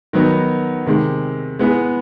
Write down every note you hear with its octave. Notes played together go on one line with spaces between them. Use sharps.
D#3 F#3 B3 D#4
C3 D#3 G#3
G#3 B3 E4 G#4